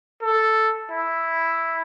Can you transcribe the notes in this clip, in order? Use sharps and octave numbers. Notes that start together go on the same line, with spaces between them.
A4
E4